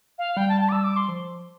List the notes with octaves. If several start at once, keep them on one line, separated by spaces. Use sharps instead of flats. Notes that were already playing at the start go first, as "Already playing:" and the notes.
F5
G3 G5
A5
A5
D6
G3 E6
D6
C6
F3